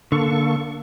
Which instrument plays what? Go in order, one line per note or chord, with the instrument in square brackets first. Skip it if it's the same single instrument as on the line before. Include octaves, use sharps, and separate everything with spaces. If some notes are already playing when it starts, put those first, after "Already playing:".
[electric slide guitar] D3 [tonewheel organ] A#3 A4 C#6